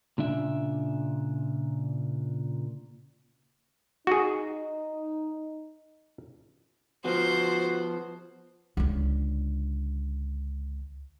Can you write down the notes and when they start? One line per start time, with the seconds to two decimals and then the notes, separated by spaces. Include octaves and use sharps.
0.18 A#2 C#3 D4 E5
4.07 D#4 F#4 G#4
7.05 F3 B3 F#4 C5
8.77 C#2 D3